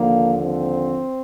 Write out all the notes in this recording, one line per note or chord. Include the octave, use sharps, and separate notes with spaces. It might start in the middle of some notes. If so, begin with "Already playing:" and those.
Already playing: D#2 D3 F3 A#3
C4